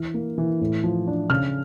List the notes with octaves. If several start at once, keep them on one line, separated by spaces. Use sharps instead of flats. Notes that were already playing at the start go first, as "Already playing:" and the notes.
Already playing: E3 F6
A#3
E3
A2
F3
D4
C#3 F6